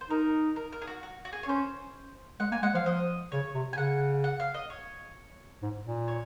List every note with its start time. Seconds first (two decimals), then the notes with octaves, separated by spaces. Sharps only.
0.01 C5
0.10 D#4 A#4
0.56 A#4
0.72 A#4
0.82 G#4
0.87 F#4
1.03 F#4
1.25 F#4
1.33 G#4
1.43 C#5
1.48 C#4 C5
2.40 G#3 F#5
2.52 A#3 G#5
2.63 G#3 F#5
2.74 F3 F5
2.86 F3 D#5
3.32 C#3 C#5
3.55 C3
3.73 G#5
3.78 C#3 F#5
4.24 F#5
4.40 F5
4.54 D#5
4.70 C#5
5.62 G#2
5.85 A#2
6.08 C#5